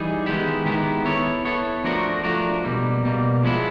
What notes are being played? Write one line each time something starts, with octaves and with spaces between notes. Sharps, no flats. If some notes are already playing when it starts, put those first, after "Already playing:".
Already playing: E3 G3 D#4 G#4
D#3 G#3 B3 E4 G4
D#3 G#3 B3 E4 G4
B3 E4 A4 C#5
B3 E4 A4 C#5
F3 A3 D4 F#4 A#4
F3 A3 D4 F#4 A#4
B2 G3 A#3
B2 G3 A#3
F3 G#3 B3 E4